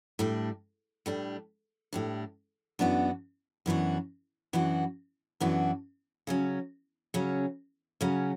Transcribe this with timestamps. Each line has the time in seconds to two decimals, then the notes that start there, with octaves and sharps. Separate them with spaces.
0.19 A2 G3 D4
1.06 A2 G3 D4
1.93 A2 G3 D4
2.79 F#2 E3 B3 D4 F#4
3.66 F#2 E3 B3 D4 F#4
4.53 F#2 E3 B3 D4 F#4
5.41 F#2 E3 B3 D4 F#4
6.27 C#3 F#3 C#4
7.14 C#3 F#3 C#4
8.01 C#3 F#3 C#4